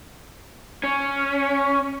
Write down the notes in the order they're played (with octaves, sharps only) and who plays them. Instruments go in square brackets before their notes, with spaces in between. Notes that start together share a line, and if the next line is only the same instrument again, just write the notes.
[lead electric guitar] C#4